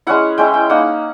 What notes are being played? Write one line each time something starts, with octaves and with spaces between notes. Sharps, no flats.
G#3 C#4 E4 F#5
G#3 C#4 E4 G5
G5
A#3 D#4 F#5